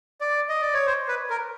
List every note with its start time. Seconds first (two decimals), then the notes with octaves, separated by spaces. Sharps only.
0.21 D5
0.49 D#5
0.61 D5
0.74 C#5
0.87 C5
1.08 B4
1.30 A#4